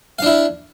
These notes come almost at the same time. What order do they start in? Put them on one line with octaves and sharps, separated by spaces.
F5 D4 E4